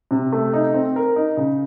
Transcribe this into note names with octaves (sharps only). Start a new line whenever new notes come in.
C3
A3
D#4
C4
A#4
D#4
C#3